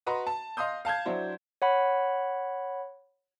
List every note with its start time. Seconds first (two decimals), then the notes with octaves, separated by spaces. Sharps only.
0.06 F#4 B4 D#5 A#5 C6
0.27 A5
0.57 D#5 F5 C6 D#6 G6
0.85 F5 A5 G6 G#6
1.06 F#3 D4 E4 C5
1.62 C#5 F#5 B5